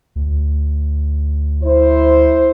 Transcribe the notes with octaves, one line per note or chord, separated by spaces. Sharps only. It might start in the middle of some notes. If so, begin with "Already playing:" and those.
D2
E4 C5